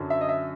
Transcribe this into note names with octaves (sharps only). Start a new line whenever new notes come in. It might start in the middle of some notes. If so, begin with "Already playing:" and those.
Already playing: F#2 D3 F#3
E5
D#5
E5